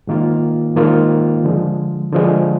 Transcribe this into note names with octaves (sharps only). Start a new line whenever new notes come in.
G#2 D#3 A#3 F4
G#2 D#3 A#3 F4
D3 F3 G#3
D3 F3 G#3